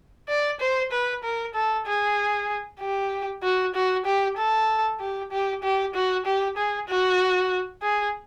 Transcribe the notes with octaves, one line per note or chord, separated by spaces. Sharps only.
D5
C5
B4
A#4
A4
G#4
G4
F#4
F#4
G4
A4
G4
G4
G4
F#4
G4
G#4
F#4
G#4